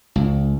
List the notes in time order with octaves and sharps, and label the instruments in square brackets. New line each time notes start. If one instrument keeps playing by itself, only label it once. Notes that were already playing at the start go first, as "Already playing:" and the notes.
[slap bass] C#2